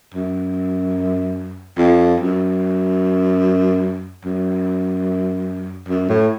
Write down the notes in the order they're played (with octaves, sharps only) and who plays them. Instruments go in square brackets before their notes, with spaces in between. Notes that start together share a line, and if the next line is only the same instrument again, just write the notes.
[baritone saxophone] F#2
F2
F#2
F#2
F#2
A2